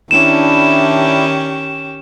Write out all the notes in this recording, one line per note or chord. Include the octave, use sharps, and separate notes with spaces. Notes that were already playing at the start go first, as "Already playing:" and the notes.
D#3 C#4 D4 E4 G4 E7